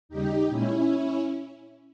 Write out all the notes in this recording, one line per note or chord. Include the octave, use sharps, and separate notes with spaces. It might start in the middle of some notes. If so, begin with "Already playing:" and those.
D#2 C#3 G3 D#4 G4
A#2 C#4 E4
G#3